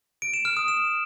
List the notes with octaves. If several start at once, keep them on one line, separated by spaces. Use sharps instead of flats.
D7
E7
F6
D#6
E7